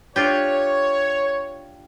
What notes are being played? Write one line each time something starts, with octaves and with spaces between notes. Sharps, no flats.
D4 F4 G4 C#5